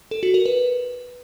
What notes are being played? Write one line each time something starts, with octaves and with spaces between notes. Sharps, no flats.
A4
F#4
A#4
B4